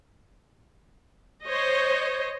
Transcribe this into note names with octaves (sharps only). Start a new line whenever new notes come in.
C5 C#5 D#5